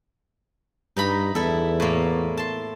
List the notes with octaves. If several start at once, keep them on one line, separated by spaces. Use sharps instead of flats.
G2 D#4 A#5 B5
E2 E4 A4
A2 A#3
A5 C6